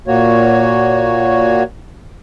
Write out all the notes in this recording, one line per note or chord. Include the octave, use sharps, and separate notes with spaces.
A#2 A#3 F#4 C#5